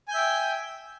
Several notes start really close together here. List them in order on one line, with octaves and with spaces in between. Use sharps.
G#5 G6 E5 G5